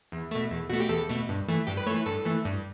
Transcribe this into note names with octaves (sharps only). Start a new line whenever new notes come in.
E2
B2 A3
E2
B2 A3 F#4
G4
E2 A4
B2 A3
G2
E3 A3
G2 G4
B4
E3 A3 C#5
B4
G2 A4
E3 A3
G2